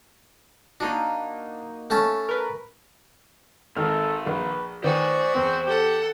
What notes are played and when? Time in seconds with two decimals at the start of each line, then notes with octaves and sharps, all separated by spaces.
0.80 A#3 D4 D#4 F#4
1.90 A3 C#4 A5
2.29 A#4 B4
3.77 G#1 D#3 D#4 G#4 A4 F6
4.27 A#1 B4
4.84 D#3 F#4 G#4 B4 C5 D5 G#5
5.34 E2 B3 C4
5.66 G4 A4 F#5